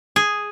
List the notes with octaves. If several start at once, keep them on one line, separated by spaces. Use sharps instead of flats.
G#4